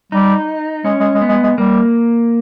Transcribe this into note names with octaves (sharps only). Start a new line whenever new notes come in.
G3 D#4
G#3 C#4
G#3
G#3
B3
G#3
G#3
G3 A#3